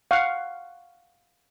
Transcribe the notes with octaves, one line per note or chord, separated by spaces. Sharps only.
F5 F#5 C#6